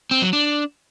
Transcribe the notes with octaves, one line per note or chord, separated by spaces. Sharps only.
C4
F#3
D4